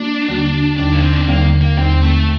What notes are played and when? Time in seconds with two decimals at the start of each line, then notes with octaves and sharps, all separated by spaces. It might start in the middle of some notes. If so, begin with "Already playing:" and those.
Already playing: A#3 D4 F#4
0.28 D#2 D3 G3 A#3 F#4
0.78 D#2 D3 G3 D4
0.93 A#3
1.03 C4
1.13 D4
1.20 C4
1.28 D#2 D3 G3 A#3
1.61 A#3
1.78 D#2 D3 G3 C4
2.03 A3